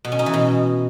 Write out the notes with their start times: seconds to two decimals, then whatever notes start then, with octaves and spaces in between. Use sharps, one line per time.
0.05 B2
0.12 C#4
0.19 D#4
0.26 E3
0.34 B2